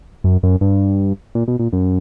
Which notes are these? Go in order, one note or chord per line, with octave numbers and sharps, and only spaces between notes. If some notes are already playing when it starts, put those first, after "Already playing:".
F#2
F#2
G2
A#2
B2
A#2
F#2